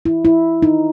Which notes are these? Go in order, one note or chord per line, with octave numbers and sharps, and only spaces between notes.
E4
E4
D#4